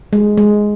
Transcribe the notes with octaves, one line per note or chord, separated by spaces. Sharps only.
G#3
G#3